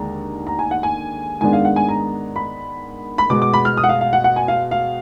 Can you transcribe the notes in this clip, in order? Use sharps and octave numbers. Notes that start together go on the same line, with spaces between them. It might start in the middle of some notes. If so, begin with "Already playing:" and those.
Already playing: D#2 D3 G#3 D4 A#5
A#5
G#5
F#5
G#5
G#2 D#3 G#3 B3 D4 G#5
F5
F#5
G#5
A#5
B5
B5
B2 G#3 B3 D6
D6
B5
F6
D#6
F#5
F5
F5
F#5
F#5
G#5
F5
F5